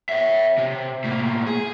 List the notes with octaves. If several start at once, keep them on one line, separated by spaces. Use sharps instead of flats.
C#5 E5
C3
A2 A#3
G#4